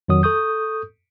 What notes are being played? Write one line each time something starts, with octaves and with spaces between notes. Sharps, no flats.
F2 D#3 F#3 D#6
A4 C#6 D#6 G6